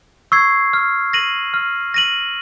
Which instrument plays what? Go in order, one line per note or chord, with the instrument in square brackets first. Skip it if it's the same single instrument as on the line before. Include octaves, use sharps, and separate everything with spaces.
[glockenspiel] C#6 E6 G#6 C7
F6
A#6 D#7 F#7
F6
A#6 D#7 F#7